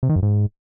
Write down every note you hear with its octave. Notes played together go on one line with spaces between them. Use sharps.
C3
D#3
F#2
G#2